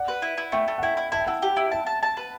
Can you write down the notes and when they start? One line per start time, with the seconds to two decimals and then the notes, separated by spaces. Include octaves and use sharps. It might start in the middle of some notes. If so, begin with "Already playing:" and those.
Already playing: D5 F#5
0.08 B4
0.22 E4
0.38 E4
0.52 A3 E5 G5
0.68 A3
0.78 F#5
0.82 E4 E5 G5
0.97 E4
1.12 E4 A5
1.20 G5
1.27 E4 F#5 A5
1.42 G4
1.57 E4
1.72 E5 G5 A5
1.87 A5
2.03 A5
2.17 B4